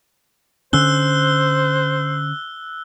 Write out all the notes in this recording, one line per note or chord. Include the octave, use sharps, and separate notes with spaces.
D3 C#4 C5 E6 F#6 G7